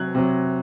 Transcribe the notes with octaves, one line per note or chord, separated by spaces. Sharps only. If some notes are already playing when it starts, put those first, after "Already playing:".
Already playing: C3 F#3 F#6 G#6
C3 F#3